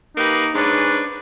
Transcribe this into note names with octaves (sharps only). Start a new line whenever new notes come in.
A#3 D#4 G4 B4
G#2 C#4 D4 B4